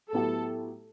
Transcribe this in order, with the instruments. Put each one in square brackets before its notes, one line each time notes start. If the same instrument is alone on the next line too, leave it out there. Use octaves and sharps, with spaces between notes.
[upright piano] A2 F#3 B3 E4 G4 [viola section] A4